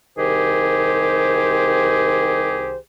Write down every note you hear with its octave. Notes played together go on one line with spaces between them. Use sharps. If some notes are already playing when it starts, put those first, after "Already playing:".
C2 D#3 G4 G#4 C5